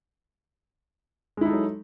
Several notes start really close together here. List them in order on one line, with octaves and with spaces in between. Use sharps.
G#3 E4 D#4 A4 F#3